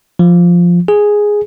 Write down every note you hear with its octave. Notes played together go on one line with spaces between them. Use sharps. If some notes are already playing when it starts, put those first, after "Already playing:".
F3
G#4